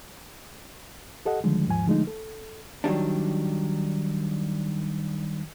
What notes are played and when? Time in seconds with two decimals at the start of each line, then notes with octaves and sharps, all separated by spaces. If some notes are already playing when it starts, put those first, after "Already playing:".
1.25 G4 A4 D#5 F#5
1.44 D3 D#3 F3 G3 G#3
1.68 D#2 G#2 F3 G#5
1.86 D3 F3 G#3 A3 D#4
2.07 A4
2.84 D#3 F#3 G3 D4